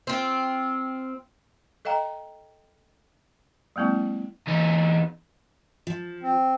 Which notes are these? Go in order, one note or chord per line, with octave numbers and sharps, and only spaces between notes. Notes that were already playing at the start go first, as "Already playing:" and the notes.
C4 F4
A4 D#5 F5 G5 A#5
F#3 G#3 A#3 C4 E4
E2 D#4
F3
C4